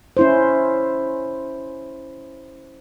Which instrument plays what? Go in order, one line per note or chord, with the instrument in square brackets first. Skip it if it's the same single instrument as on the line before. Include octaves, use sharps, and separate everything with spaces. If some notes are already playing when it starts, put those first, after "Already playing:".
[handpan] C#4 E4 C5